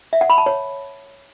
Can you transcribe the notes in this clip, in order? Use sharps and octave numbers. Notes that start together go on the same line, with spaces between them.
E5
F#5
B5
A5
C#5